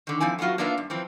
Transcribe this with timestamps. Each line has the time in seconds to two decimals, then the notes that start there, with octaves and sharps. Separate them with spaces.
0.07 D3 D#3
0.20 F3 C4 E4 G#5
0.39 F#3 A3 B3 F4 F#4
0.58 A#3 B3 D4 F4 A#4 E5
0.78 G2
0.90 E3 F3 C4